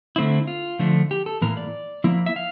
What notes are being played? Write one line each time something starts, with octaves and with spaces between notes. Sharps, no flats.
D3 A3 C4 E4
F4
D3 F3 A3 D4
G4
A4
A2 E3 A#3 A#4
D5
F3 A#3 E4
E5
F5